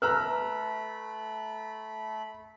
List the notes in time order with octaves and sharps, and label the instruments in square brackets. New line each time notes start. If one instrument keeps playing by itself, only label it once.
[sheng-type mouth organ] A3 B5 [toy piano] B4 [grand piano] A#5 E6 F#6